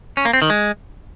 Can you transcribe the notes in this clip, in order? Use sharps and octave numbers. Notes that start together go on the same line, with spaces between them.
C#4
A#3
C4
D#3
G#3